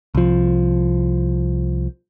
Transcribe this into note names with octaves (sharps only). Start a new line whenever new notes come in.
C2 F3